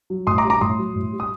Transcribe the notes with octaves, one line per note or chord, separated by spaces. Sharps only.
F#3
A2 C6 D#6
A#5 D6
G3
A#5 D6
A2 C6 D#6
F#3
A2
G3
D#6